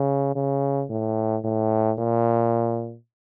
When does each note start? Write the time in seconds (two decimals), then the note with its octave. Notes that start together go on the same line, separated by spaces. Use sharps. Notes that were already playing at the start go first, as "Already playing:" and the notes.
Already playing: C#3
0.35 C#3
0.90 A2
1.44 A2
1.99 A#2